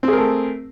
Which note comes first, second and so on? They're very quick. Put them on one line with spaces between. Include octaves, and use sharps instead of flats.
C4 G#4 A#4 A3